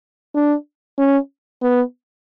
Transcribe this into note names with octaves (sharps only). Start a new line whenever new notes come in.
D4
C#4
B3